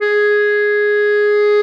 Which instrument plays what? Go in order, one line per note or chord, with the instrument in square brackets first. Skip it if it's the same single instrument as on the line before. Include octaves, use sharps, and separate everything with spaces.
[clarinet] G#4